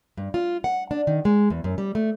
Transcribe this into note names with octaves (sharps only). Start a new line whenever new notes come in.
G2
F4
F#5
D4
D#3
G#3
E2
F#2
G3
A3